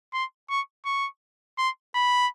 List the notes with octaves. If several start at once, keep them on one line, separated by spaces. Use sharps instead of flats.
C6
C#6
C#6
C6
B5